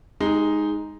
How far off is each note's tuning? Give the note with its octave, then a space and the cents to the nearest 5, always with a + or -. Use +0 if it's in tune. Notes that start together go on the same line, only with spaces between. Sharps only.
G#3 +0 D#4 +0 G4 +20